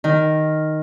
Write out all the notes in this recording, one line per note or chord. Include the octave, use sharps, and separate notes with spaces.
D#3